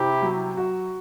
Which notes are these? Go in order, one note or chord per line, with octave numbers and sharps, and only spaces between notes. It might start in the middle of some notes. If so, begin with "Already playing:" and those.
Already playing: C3 E4 G4
F#3
F#4